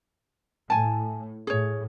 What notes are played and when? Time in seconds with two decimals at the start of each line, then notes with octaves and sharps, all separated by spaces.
0.70 A2 G#5 A5
1.47 A2 G#4 C#5